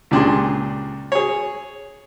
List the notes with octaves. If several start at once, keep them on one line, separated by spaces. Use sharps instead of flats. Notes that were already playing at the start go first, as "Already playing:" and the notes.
C#2 A#2 D4 G4 G#4 C6
G#4 C#5